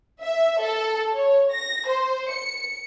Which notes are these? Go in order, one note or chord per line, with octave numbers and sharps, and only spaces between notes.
E5
A4
C#5
A#6
C5
C#7